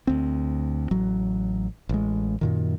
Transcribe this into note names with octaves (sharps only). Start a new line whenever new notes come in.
D2 C4
A1 F#3
A1 G#3
F#2 A#2 D#3